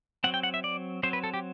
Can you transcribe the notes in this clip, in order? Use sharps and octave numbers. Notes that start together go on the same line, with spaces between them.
F#3 C4 F#5
G5
F#5
E5
D5
F#3 C4 C5
B4
A4
G4